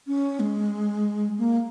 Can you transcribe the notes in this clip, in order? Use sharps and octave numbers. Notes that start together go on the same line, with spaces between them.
C#4
G#3
A#3